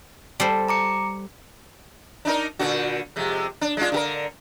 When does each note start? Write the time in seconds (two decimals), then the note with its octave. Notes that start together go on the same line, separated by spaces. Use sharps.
0.40 G3 A4 C5
0.68 A#5 D6 C#7
2.25 D4 D#4 A#4
2.59 A#2 D3 F#4
3.16 F2 C3 G#3
3.61 D4
3.77 G#3 D4 F4
3.92 D3 G4 A#4